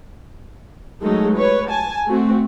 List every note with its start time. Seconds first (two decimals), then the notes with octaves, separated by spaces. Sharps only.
1.01 F#3 G#3 A3 D#4 A4
1.36 B4 C#5
1.70 G#5 A5
2.09 A3 C4 F#4